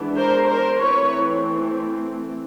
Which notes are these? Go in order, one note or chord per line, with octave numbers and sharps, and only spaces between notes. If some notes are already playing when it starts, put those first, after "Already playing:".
Already playing: E3 G#3 B3 D4
A#4 C5
A#4 C5
E3 A3 C4 B4 C#5